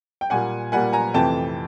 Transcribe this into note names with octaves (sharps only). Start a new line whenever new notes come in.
G5
A#2 G3 A#3 F#5 G#5
A#2 G3 A#3 F#5 G#5
G#5 A#5
F2 C3 E3 A3 G5 A5